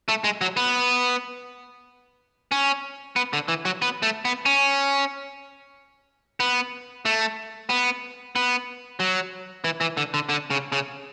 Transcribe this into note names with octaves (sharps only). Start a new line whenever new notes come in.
A3
G#3
F#3
B3
C#4
B3
D3
E3
F#3
B3
A3
B3
C#4
B3
A3
B3
B3
F#3
E3
E3
D3
D3
D3
C#3
C#3